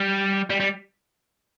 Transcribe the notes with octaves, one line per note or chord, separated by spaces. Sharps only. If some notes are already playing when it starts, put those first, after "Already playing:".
Already playing: G3
G3
G3